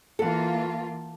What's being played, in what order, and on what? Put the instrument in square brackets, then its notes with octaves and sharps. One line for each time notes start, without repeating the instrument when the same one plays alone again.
[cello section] E3 A#3 F4 [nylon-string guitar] A4 F#5